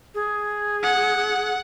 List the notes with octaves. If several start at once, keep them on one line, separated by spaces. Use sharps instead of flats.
G#4
F#5